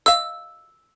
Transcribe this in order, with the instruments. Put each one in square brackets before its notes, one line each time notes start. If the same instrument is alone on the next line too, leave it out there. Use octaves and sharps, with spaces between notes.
[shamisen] D#5 F5 [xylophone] E6